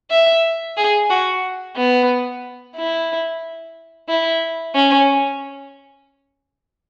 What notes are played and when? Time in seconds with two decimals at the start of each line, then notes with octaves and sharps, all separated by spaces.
0.11 E5
0.77 G#4
1.10 F#4
1.77 B3
2.76 E4
4.08 E4
4.75 C#4